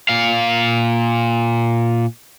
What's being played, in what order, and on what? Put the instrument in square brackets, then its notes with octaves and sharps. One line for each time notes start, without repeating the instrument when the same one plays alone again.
[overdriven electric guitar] A#2 F5